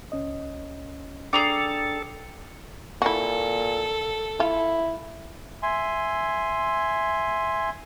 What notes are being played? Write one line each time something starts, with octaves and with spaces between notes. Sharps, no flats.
C#2 C#4 D#5
D4 G#4 A4 D5 G5 A#5 D6
A#2 E4 F#4 A4
E4 F4
E5 G#5 C6